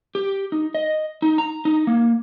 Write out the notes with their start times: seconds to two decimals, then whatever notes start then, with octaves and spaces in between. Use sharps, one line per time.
0.15 G4
0.52 D#4
0.75 D#5
1.22 D#4
1.38 A#5
1.65 D#4
1.87 A#3